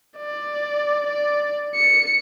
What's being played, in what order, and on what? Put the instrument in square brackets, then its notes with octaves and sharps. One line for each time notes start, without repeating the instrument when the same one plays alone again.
[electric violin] D5
D5
C#7